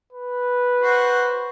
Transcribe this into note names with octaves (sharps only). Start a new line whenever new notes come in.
B4
F#4 C5